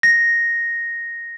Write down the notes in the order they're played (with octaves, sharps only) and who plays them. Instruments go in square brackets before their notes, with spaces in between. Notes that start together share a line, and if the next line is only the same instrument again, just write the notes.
[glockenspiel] A#6